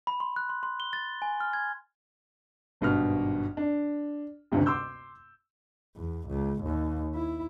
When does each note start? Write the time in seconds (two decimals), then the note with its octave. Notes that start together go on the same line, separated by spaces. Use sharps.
0.07 B5
0.20 C6
0.36 F#6
0.49 C6
0.63 C6
0.80 G7
0.93 A6
1.22 G#5
1.40 F6
1.53 G#6
2.81 G#1 G2 B2 F6
3.57 D4
4.52 D#1 D2 G2 C3
4.66 C6 D6 E6 G6
5.97 E2
6.29 C#2
6.62 D#2
7.15 E4